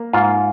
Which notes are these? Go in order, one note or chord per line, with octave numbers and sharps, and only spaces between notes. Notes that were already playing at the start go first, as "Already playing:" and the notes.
Already playing: A#3
G#2 F4